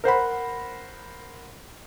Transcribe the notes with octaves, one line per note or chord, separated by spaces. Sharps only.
A#4 C5 F#5 B5